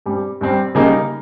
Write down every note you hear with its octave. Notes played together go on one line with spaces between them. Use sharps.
G2 G3 C4
G2 G3 C4
C#3 G3 A#3 D#4